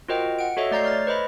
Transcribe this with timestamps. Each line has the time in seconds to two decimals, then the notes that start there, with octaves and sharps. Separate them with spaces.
0.08 F4 F#4 A#4 C5 D#5 G5
0.39 F#5 D7
0.57 F#4 A4 C#5 D#5 E5
0.71 A3 D5 A#5 G6 C7
0.84 C#5 F6 A6
1.07 B4 C5 D#5 B5